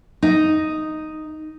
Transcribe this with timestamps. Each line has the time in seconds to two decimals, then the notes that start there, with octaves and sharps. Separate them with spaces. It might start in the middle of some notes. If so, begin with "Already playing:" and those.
0.23 D#4